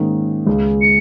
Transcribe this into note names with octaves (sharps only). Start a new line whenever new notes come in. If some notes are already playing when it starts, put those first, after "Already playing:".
Already playing: G#2 D#3 A#3 C#4
C#2 C#3 G#3
C#7